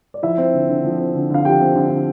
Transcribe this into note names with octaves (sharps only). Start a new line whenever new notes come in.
D5
F3 E4 E5
C4
D3
D3
F3
C4
D3
D3 F5
F3 G4 G5
C4
D3
D3